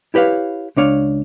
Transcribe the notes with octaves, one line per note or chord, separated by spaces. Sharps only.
E4 G4 B4 C#5 F5
C#2 D4 C#5 F5